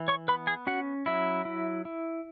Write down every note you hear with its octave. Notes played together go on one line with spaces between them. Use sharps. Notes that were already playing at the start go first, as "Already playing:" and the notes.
Already playing: E3
C#5 C#6
B3 B4 B5
G#4 G#5
C#4 F#4 F#5
F#3 E4 E5
E4
E4